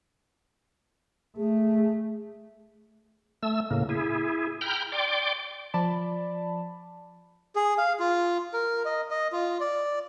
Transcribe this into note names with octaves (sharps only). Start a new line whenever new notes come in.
A3 G#4
A3 E6
A2 C#3 A#3
E4 G#4
G5 A#5 B5 F6 G6
D5 G5 C6 D6
F3 D5 A5 B5
G#4
F5
F4
A#4
D#5
D#5
F4
D5